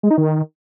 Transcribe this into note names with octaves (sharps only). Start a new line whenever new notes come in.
G#3
D#4
D#3